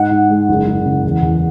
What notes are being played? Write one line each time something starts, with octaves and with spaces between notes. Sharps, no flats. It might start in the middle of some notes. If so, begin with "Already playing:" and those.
Already playing: G#2 F#5
G#2
G#3
F#1
F#1
C#3
E2
E2